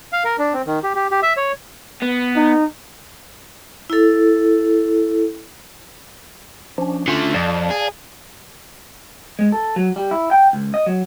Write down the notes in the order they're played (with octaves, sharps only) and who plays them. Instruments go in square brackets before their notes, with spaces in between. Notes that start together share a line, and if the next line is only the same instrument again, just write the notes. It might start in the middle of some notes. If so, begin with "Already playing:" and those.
[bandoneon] F5
A#4
D4
C4
D#3
G4
G4
G4
E5
C#5
[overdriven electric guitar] B3
[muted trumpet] D#4
[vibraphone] E4 A4
[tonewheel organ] F3 C#4 D4
[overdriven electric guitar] D3 A3 [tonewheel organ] C#4 F4
[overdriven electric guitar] F2 [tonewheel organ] D5 F5 A5
[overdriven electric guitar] G#4
[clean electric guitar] G#3
A4
F#3
G3
E4
G5
C#2
D#5
F#3